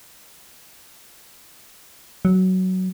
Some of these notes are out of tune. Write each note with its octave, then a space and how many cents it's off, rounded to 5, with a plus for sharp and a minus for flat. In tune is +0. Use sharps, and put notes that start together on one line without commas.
F#3 +10